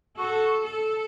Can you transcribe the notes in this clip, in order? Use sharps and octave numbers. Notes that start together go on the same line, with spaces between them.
F#4 A4
A4